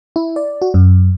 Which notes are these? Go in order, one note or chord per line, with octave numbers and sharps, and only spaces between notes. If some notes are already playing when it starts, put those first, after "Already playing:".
E4
D5
F#4
F#2